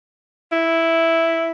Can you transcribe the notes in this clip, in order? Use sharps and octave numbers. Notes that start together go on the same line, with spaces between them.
E4